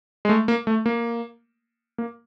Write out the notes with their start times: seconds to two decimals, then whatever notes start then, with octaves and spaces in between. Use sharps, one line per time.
0.25 G#3
0.29 A3
0.48 A#3
0.67 A3
0.86 A#3
1.98 A#3